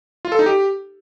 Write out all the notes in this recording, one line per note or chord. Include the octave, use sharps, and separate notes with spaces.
F4
A4
D#4
G4